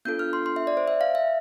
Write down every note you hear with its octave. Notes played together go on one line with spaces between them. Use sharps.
B3 D4 F4 A4 G6
F6
C6
C6
E5
D5
C5
E5
F5
E5